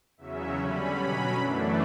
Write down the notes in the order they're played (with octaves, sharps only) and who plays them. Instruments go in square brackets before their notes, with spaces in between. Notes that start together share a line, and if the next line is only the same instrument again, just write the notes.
[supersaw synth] E2 C#3 F#3 C#4 E5
D3 G3 C#4 B5
B2 F#3 C#4
F#2 E3 A3 D4